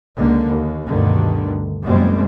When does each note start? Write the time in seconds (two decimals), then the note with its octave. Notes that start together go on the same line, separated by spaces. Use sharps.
0.17 C#2 D3 A#3
0.49 D#2
0.88 D2 G2 B2 D3 D#3
1.83 F#1 F#2 B2 G3 G#3 C4